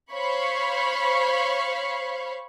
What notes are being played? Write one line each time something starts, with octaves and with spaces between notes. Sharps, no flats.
C5 C#5 F5 B5 C#6